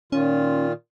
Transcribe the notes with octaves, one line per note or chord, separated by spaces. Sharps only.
A#2 D#3 C#4 F4